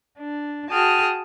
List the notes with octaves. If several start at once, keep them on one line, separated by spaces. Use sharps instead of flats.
D4
F#4 G#4 G5 A5 D#6 F6